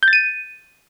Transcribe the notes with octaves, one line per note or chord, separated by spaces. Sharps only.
G6
A6
D#7